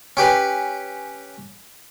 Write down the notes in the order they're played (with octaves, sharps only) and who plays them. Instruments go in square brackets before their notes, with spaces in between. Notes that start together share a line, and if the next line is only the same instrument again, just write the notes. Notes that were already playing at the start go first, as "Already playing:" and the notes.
[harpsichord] C#4 G4 B4